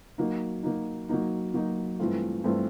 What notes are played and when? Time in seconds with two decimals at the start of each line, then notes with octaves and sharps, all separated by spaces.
0.18 F#3 A#3 D#4
0.63 F#3 A#3 D#4
1.09 F#3 A#3 D#4
1.54 F#3 A#3 D#4
1.99 G2 E3 A3 C4 F4
2.44 G2 E3 A3 C4 F4